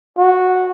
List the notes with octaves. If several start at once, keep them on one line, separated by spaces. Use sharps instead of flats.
F#4